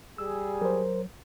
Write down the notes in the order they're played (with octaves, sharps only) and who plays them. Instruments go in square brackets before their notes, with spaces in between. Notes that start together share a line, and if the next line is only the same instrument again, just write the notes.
[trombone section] G3 G#4 [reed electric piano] E6
[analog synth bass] F#3 [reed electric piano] A#4 C5